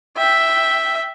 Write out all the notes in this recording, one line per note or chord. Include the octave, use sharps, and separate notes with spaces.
E5 G5